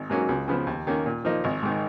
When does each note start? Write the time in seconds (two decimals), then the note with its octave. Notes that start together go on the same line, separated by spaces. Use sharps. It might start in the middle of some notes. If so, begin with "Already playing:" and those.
Already playing: G#1
0.10 G#2 F#3 A#3 C#4
0.29 C#2
0.48 C#3 F3 B3
0.67 D#2
0.87 D#3 A#3 C#4
1.06 A#2
1.25 F3 A#3 D#4
1.44 G#1
1.63 G#2 D#3